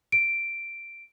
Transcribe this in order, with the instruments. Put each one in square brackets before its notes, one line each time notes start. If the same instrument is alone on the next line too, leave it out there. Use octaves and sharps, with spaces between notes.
[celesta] D7